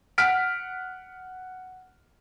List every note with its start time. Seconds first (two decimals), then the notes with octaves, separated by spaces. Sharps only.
0.18 F#5 F6 B6 D7